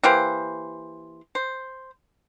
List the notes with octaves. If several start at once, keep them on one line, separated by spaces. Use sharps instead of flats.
E3 A#3 G4 C5
C5